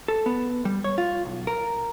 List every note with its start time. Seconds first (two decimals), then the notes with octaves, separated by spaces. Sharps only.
0.08 A4
0.26 B3
0.65 G3
0.84 C#5
0.98 F4
1.25 B1
1.47 A#4